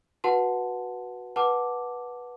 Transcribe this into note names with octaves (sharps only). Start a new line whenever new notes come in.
F#4 B4 F#5 A5 C6
B4 F#5 A5 D6